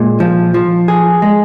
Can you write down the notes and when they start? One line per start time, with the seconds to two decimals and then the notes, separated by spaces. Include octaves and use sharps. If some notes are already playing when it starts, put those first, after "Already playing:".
Already playing: A#2 G#3
0.20 F3
0.54 F3
0.88 G#4
1.22 G#3